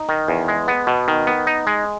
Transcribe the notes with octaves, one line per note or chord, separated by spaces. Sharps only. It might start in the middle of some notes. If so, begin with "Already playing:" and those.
Already playing: D#4
D#3
E2
G#3
B3
B2
D#3
B3
D#4
G#3